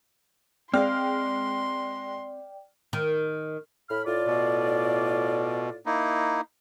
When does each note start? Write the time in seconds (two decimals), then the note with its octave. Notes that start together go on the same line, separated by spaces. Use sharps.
0.74 G#3 C4 D5 F5 G5 C6 F6
2.93 D#3
3.89 A2 B5 F6
4.06 A2 F4 D5
4.27 B2
5.86 A#3 D#4 E4